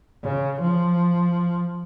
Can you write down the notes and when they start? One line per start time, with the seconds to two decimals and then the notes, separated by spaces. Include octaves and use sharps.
0.23 C#3
0.61 F3